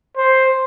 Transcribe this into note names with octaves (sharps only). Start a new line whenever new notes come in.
C5